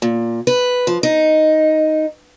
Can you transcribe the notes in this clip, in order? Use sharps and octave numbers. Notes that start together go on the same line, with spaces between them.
A#2
B4
F3
D#4